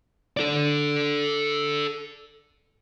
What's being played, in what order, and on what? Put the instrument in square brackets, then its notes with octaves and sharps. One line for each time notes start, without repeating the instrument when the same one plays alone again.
[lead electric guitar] A4 D5